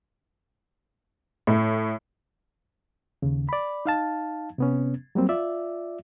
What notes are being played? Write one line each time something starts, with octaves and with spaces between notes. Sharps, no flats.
A2
D#2 C#3
D5 B5
D#4 F5 A5
C3 B3 C#4
F#3 G3 A#3 C4
F4 D5 E5